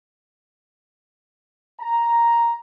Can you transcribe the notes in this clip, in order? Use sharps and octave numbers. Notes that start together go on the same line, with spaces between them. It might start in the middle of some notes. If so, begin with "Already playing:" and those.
A#5